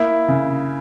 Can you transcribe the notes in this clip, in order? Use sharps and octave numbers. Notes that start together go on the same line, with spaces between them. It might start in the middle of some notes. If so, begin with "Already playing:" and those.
Already playing: A#3 E4
C#3